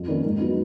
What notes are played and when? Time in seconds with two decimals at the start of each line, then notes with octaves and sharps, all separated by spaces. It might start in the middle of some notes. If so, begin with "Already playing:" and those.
Already playing: F2
0.08 D#3 A#3 C#4
0.24 G#2
0.40 F#3 B3 D#4